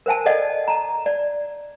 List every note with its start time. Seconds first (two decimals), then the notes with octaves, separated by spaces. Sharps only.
0.06 A#4 C5 F#5 G#5 A5
0.26 A4 D5 D#5 F#5
0.68 A5 A#5
1.06 D5